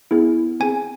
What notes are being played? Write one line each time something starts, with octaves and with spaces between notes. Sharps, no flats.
B3 E4 G#4
C4 G#4 G#5